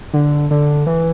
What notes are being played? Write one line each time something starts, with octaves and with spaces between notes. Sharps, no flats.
D3
D3
E3